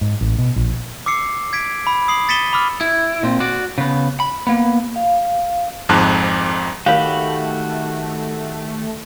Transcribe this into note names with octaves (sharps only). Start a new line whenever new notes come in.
G#2
A1
B2
A#1
D6 E6 C7 C#7
G#6 B6 D7
B5
D#6 C7 F#7
A6 B6 C#7 D#7 E7 G7
B5 D6 E6 F6
E4
A#2 C4
F#4 D5
C#3 B3
B5
A#3 B3
F5
G#1 F2 G#2 A5 F#6
D#3 A3 F#4 G4 A#4 C#5 F5 B5